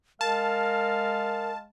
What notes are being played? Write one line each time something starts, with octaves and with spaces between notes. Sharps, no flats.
G#3 A#4 F5 A5